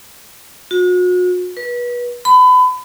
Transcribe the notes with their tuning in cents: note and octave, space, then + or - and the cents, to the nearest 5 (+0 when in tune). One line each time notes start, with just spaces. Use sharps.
F#4 -40
B4 -30
B5 +30